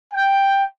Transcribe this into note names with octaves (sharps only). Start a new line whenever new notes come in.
G5